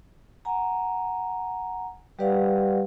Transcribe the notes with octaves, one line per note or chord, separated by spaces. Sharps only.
F#5 G#5 A#5
G3 G4 B4 D5 F5 F#5